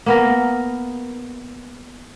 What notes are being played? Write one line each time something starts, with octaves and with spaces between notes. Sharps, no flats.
A#3 B3 A#4